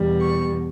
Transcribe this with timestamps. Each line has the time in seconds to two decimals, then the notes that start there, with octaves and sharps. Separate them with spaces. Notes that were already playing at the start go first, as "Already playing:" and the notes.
Already playing: E2 B2 G3
0.20 C#6